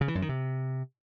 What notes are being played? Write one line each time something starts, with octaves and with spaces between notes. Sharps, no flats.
C#3
E3
F#2
D#3
C3